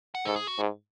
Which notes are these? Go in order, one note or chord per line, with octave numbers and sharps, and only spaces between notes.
F#5
G#2 A4
G#4
F#4
G#2